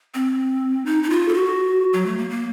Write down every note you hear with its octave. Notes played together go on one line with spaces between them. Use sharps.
C4
D#4
D#4
F4
A4
F#4
F#3
A3
A#3
A#3